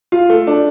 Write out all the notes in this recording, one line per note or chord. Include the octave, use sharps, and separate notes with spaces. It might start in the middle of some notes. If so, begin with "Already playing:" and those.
F4
A3
D4